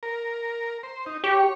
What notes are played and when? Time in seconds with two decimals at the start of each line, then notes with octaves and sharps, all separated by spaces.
0.03 A#4
0.83 C5
1.06 D#4
1.24 G4 C#5